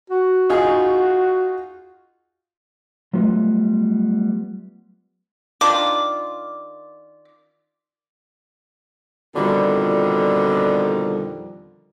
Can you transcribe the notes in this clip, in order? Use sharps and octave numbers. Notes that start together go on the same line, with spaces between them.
F#4
D#4 F4 G#4
F#3 G3 A3 B3 F4
D#3 D4 F4 D6
F2 B2 D3 D#3 F3 G3